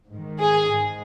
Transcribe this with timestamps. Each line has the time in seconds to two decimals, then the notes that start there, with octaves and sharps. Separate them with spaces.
0.10 G#2 D#3
0.41 G#4
0.73 G#2